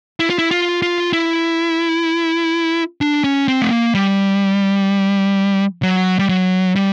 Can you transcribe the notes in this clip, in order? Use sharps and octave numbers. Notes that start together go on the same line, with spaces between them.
E4
F4
E4
F4
F4
E4
D4
C#4
C4
A3
A#3
G3
F#3
G3
F#3
G3